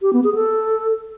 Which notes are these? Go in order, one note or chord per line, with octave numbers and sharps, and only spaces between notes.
G4
B3
G#4
A4